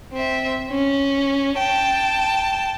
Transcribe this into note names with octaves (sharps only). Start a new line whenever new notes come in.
C4 E5
C#4
G5 A5